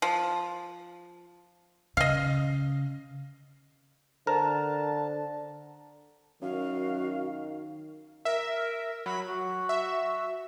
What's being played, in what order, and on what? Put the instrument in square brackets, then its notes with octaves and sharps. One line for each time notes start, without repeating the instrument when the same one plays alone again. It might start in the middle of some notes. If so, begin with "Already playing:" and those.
[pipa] F3
[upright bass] C#3 [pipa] D#5 F5
[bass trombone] D3 [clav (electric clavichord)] A#4 [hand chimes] C5 [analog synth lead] A5
[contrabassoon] F#2 [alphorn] D#3 [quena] F#4 [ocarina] F5
[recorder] A#4 [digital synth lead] E5
[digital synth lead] F#3 [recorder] B5
[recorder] F#4
[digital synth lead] E5